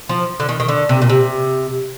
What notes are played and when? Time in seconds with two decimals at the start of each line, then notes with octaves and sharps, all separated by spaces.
0.09 F3
0.40 D3
0.49 D#3
0.60 D#3
0.68 D3
0.89 C3
1.02 A#2
1.09 C3